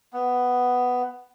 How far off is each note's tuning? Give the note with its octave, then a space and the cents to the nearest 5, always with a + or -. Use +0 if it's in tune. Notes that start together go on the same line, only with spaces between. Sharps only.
B3 +5